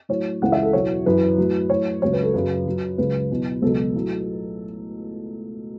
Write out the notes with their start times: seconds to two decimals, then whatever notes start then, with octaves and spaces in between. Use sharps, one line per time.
0.09 A2 F#3 C#5
0.42 C#2 C#3 E3 F#5
0.52 E5
0.63 A4
0.73 E2 B2 F#3 C#5
1.06 F#2 E3 B4
1.38 A2 F#3
1.70 A2 F#3 C#5
2.02 C#2 C#3 F#3 C#5
2.13 B4
2.23 A4
2.34 F#2 C#3 F#3 B4
2.66 F#2 F#3
2.98 C#2 C#3 F#3 B4
3.30 E2 B2 F#3
3.62 C#2 B2 F#3 A4
3.95 A2 F#3